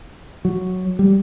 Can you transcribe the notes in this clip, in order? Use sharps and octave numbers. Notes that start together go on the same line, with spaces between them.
F#3
G3